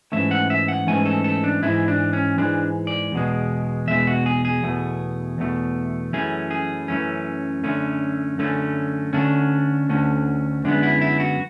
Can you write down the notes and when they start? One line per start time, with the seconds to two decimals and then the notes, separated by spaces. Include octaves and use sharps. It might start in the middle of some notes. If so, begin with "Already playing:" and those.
0.12 G#2 E3 A3 C#4 E5
0.31 F#5
0.50 E5
0.68 F#5
0.87 G#2 E3 A3 C#4 G#5
1.05 A4
1.24 A4
1.44 D4
1.62 G#2 E3 G#3 E4
1.88 D4
2.13 C#4
2.37 G#2 E3 G#3 D4
2.87 D5
3.12 E2 B2 G#3
3.87 E2 B2 G#3 E5
4.07 F#4
4.26 G#4
4.45 G#4
4.63 E2 B2 A3
5.38 E2 B2 A3
6.13 F#2 E3 A3 C#4 G#4
6.51 G#4
6.88 F#2 E3 A3 C#4
7.63 F#2 D3 A3 C#4
8.38 F#2 D3 A3 C#4
9.13 D2 D3 A3 C#4 D4
9.89 D2 D3 A3 C#4
10.64 F#2 D3 G#3 B3 D4
10.83 E4
11.01 E4
11.20 F#4